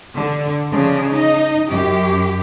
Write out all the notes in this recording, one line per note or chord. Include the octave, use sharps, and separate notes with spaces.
D3
C#3 F3 D4
D#4 D#5
F#2 G4